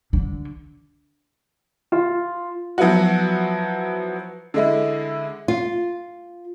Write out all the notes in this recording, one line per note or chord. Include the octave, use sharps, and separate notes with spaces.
D3
F4
F3 F#3 B3 E4 F#4
D3 G#3 E4
F4